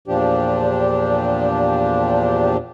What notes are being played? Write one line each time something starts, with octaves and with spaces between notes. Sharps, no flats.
E2 A#2 F3 D4 G4